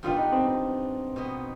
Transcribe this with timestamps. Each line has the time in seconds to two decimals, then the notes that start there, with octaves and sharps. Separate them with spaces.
0.03 G2 D#3 B3 D4 F4
0.18 D#4
0.32 C4
0.46 C4
1.16 B2 B3 D#4